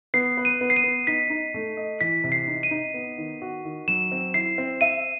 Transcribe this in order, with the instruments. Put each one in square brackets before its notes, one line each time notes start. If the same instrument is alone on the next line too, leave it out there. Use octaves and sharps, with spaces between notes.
[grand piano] B3 [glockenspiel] C7
[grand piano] B4
[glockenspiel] D#7
[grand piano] B3
[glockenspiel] C7
D#7
[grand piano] B3
[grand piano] D#4 [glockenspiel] B6
[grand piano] D#4
A3
D#5
[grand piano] E3 [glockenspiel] B6
[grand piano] C3
[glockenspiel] C7
[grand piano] D#4
[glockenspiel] D#7
[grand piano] D#4
B3
D#3
F#4
D#3
[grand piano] F#3 [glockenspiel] E7
[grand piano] C4
[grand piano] E4 [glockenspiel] C7
[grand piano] C4
[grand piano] E5 [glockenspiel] D#7